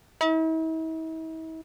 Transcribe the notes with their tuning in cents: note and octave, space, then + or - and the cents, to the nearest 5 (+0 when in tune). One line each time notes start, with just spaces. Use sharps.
E4 -45